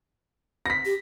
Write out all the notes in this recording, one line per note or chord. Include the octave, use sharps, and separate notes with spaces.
A#6 B6
G4